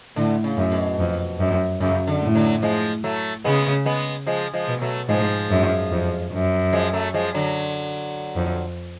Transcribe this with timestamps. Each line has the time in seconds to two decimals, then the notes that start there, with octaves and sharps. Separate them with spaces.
0.16 A2 D3
0.44 C#3
0.57 F#2
0.71 B2
0.99 F2
1.39 F#2
1.80 F#2 C#3
2.07 D3
2.21 A2
2.35 D3 F#3
2.62 F3 G#3
3.04 F#3 A3
3.44 C#3 G#3 B3
3.85 G#3 B3
4.26 F3 G#3
4.53 F3 G#3
4.68 B2
4.81 F#3 A3
5.08 G#2 F3 G#3
5.50 F#2
5.91 F2
6.32 F#2
6.73 F3 G#3
6.93 F#3 A3
7.14 F3 G#3
7.34 D3 F#3
8.36 F2